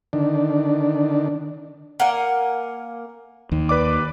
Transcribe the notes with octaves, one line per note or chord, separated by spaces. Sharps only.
D3 D#3 D4
A#3 A#4 F#5 G#5
D#2 D#3
B4 D5 D6